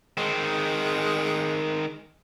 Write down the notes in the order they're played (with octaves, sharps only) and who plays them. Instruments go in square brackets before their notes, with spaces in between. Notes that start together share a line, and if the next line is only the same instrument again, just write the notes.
[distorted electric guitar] D#3 C4 [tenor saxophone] G#3